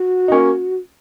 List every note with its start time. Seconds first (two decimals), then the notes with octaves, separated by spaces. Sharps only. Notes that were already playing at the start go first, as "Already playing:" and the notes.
Already playing: F#4
0.28 D#4
0.32 A#3 C#4